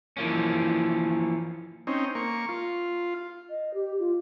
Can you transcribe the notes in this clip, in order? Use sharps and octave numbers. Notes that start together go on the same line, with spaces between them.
E3 F3 A#3 C#4
C4 C#4 D#4
A#3 C#6
F4
D#5
G4
F4